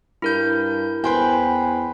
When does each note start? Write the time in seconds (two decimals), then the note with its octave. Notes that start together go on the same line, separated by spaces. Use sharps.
0.22 G2 E4 A#4 G6
1.04 E2 B4 C5 G5 G#5